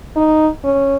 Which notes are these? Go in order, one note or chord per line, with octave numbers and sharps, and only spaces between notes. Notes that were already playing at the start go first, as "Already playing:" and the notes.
D#4
C#4